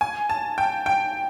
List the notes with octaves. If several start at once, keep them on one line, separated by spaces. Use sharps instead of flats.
G#5
A5
G5
G5